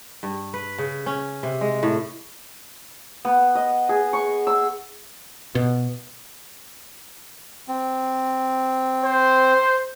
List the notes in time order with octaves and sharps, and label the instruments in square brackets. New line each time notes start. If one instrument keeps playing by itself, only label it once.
[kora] G2
B4
C#3
C#4
C3
G#3
A2
[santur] B3
D#5
G#4
C#6
E6
[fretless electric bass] B2
[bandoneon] C4
[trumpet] C5